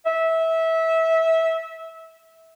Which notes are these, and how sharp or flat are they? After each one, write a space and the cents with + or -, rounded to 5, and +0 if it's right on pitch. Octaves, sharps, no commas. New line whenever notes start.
E5 -20